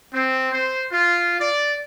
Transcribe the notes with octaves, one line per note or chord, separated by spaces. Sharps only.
C4
C5
F4
D5